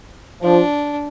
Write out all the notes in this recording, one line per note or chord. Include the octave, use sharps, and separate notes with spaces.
F3 D4